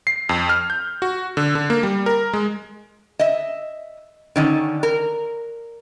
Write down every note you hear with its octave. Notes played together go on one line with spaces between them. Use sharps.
C7
F2
F6
G6
F#4
D3
D3
A#3
G3
A#4
G#3
D#5 E5
D3 D#3 C#4
A#4